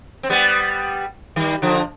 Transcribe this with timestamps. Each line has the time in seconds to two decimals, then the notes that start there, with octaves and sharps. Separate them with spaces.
0.23 C4
0.30 G3 B3
1.36 D#3 G3
1.62 D3 F3